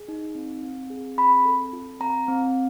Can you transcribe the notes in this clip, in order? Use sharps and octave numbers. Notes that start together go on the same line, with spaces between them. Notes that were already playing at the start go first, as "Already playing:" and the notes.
Already playing: G#4
D#4
C4
C4
G#4
C4 B5
A4
F4
C4 A#5
C4